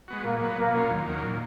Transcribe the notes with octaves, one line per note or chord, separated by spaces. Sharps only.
G#3 B3 F#4
A#2 A#3
F#3 B3
B2 A#3
F#3 C#4 F4
D#2
D#3 F#3 A#3
A#2